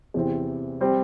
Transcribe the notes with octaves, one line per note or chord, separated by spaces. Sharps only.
E2 C3 E3 C4
G3 C4